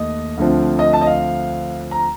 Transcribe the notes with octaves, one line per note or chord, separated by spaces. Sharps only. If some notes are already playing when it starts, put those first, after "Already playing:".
Already playing: D#2 A3 D#5
D2 D3 F3 C4
D#5
A5
D#5
F5
A#5